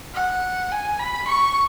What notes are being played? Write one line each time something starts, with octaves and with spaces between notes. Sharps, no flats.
F#5
G#5
B5
C#6